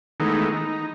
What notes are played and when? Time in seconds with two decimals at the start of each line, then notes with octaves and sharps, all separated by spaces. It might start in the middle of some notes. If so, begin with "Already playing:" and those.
0.20 D#3 E3 G#3 A3 B3 D#4
0.52 D#4